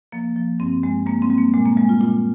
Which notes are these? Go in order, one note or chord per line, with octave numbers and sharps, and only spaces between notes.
F3 A#3
F3
G2 C4
G2 G#3
G3 A#3
C4
G3
A#3
A#2 G#3
A#3
G3 G#3
F4
A#2 F4